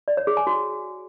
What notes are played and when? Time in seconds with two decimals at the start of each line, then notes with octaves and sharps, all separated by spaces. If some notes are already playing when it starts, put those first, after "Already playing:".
0.08 D5
0.17 C#5
0.27 G#4
0.37 G#5
0.47 F#4